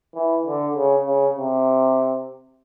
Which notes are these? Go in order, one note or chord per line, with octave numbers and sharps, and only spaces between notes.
E3
D3
C#3
C#3
C3